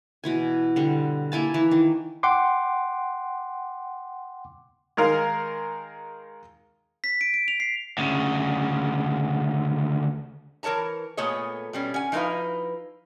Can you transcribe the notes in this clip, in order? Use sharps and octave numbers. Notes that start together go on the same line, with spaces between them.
B2 E3 G#5
D3 G3
A#3 E4 G#5 A5
E3
D#3
F#5 G5 C6 D6
D#3 G#3 A#4 F5
B6
D7
D7
F7
C7
D2 C#3
E3 A#4 C#5 A5 A#5
A#2 A3 B3 G#4 C#5 D#5
B2 G3 C#4
C#4 F#5 G#5
F3 D#4 E4 G#4 B4 F5